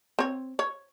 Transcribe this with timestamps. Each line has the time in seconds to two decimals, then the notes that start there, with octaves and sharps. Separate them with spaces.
0.19 C4 C#5
0.59 C#5